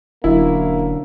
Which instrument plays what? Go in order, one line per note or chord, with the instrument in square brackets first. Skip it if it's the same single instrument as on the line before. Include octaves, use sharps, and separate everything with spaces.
[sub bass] E1 [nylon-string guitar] D3 F#3 C#4 [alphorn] A#3 [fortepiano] E4